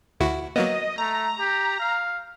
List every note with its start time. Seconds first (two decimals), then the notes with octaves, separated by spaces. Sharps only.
0.20 D2 E4 F#4
0.56 F#3 A#3 B3 D#5
0.98 A3 A#5
1.40 G4
1.79 F5